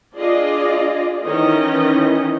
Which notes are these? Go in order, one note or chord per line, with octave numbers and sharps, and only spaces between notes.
D4 F4 G#4 D5 D#5
D#3 E3 C#4 D#5